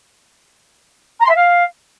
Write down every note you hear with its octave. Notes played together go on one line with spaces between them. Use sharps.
A#5
C6
E5
F5